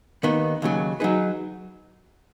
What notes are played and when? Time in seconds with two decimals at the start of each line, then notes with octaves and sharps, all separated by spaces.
0.23 D#2 D#3 B3
0.62 D#2 C#3 F#3
1.00 F#3 D#4 G#4 B4